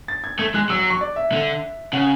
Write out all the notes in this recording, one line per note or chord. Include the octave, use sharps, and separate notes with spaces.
A6
G#6
A3 G#6
G#3 F#6
F#3 E6
E6
C#6
D5
E5
D3
C#3 F#5